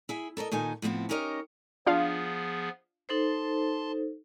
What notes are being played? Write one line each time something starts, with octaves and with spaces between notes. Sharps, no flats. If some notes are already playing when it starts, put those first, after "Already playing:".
E4 G#4 E5
A4 A#4 C#5 D#5
A#2 D#3 D#4 A4 G#5
A2 F3 B3 C4 E4
C#4 D#4 G4 A#4 C#5 D#5
F3 B3 D4 F4 G#4 F5
D#4 A4 C5 A5 C6